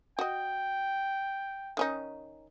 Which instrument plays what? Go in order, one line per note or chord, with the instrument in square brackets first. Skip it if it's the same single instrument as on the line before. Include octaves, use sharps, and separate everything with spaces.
[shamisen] F#4 D#5 [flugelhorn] G5
[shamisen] D#3 C#4 D#4